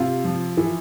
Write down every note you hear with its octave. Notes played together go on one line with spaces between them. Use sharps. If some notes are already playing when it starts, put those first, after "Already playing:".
Already playing: C3 F4
F3
E3